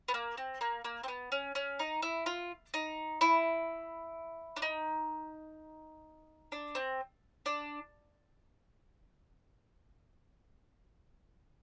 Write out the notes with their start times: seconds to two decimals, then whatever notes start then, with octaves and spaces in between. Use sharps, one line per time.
0.08 B3
0.14 A#3
0.37 C4
0.61 A#3
0.84 A#3
1.03 C4
1.08 B3
1.32 C#4
1.55 C#4
1.79 D#4
2.02 E4
2.26 F4
2.74 D#4
3.21 E4
4.56 D4
4.62 D#4
6.52 D4
6.75 C4
7.46 D4